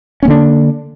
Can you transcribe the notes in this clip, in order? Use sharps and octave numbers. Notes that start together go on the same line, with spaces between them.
D3 A#3 C#4 D4